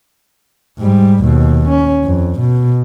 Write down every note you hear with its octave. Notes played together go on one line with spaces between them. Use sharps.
G#2 G3
D#2 B2
C#4
F2
B2